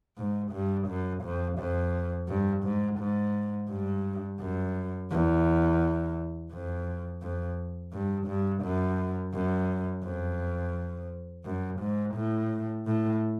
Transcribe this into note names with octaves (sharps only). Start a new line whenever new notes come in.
G#2
G2
F#2
F2
F2
G2
G#2
G#2
G2
F#2
E2
F2
F2
G2
G2
F#2
F#2
F2
F#2
G#2
A2
A2